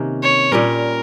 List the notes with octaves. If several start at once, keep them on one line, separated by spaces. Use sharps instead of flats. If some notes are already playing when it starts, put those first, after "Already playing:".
Already playing: C3 D#3 A#3 C#4
C#5
A#2 G3 C#4 A#4